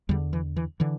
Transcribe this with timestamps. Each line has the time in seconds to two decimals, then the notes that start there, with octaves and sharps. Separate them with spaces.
0.09 E2 D3 G3
0.33 E3
0.56 E3
0.80 D3 E3